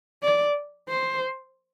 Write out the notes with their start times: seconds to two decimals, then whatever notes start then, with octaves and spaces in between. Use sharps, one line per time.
0.23 D5
0.89 C5